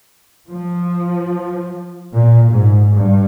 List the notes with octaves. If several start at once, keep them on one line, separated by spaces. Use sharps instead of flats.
F3
A#2
G#2
G2